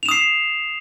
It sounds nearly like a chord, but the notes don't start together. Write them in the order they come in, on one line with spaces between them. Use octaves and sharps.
F7 E7 D#6 C7